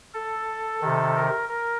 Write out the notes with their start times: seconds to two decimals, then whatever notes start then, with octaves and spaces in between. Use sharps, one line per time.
0.14 A4
0.81 C3 D#3
1.16 A#4
1.49 A#4